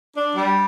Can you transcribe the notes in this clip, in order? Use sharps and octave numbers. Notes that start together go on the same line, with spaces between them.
D4
G3